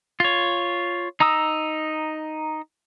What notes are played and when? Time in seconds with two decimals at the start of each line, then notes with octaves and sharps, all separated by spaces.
0.20 F4 C#5
1.20 D#4 A#5 D#6 E6